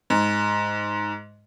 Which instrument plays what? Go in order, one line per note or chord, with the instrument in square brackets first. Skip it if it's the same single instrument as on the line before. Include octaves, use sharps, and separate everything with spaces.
[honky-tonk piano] G#2